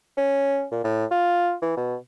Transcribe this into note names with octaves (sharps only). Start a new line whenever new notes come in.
C#4
A#2
A2
F4
E3
B2